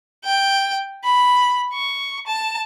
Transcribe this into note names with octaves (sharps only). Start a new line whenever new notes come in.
G5
B5
C#6
A5